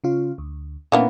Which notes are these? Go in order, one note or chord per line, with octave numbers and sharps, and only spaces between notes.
C#3 C#4 F4
D2
A#2 E3 A#3 B3 C#4 D4